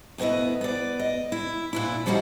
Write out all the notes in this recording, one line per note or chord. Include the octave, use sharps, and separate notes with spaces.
D2 B2 B3 E4 D#5
B3 D5
D#5
E4
A#2 D4 E4
F3 G3 C#4 D#4 F#4